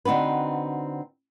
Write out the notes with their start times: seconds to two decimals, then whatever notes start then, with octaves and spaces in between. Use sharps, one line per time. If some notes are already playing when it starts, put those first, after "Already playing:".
0.05 D3 C4 D#4 F#4 B4